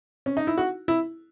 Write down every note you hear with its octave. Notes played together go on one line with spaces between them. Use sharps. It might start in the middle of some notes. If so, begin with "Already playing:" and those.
C#4
D#4
E4
F#4
E4